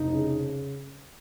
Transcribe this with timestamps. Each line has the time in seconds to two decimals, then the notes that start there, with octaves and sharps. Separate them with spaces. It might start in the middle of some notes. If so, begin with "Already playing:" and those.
Already playing: F1 D#4
0.13 C#3